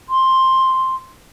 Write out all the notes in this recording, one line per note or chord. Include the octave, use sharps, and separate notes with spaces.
C6